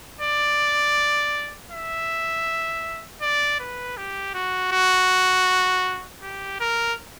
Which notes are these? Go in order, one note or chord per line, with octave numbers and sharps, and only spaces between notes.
D5
E5
D5
B4
G4
F#4
F#4
G4
A#4